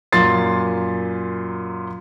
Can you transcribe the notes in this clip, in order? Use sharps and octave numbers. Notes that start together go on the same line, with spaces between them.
F#2 A#2 C6 A6 C7